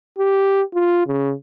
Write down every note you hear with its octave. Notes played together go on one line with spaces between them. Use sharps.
G4
F4
C#3